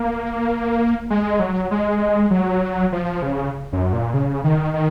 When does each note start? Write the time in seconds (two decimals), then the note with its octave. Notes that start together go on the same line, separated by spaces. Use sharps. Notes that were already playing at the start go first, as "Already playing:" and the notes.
Already playing: A#3
1.10 G#3
1.39 F#3
1.71 G#3
2.31 F#3
2.92 F3
3.22 C#3
3.73 F#2
3.93 A#2
4.14 C#3
4.44 D#3
4.74 D#3